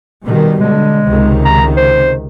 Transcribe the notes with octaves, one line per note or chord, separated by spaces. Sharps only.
B2 D#3 G3
D3 G#3
C#2 C3 D#3
A#5
C5